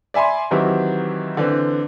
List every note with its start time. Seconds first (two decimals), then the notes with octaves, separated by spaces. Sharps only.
0.14 D5 E5 G#5 B5 C6
0.51 D#3 E3 F#3 C4 E4 G4
1.37 D3 E3 C4